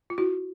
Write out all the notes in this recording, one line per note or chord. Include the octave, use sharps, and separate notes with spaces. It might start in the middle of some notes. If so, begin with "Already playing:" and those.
F4
E4 F#4